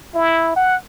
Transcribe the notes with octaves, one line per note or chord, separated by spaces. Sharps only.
E4
F#5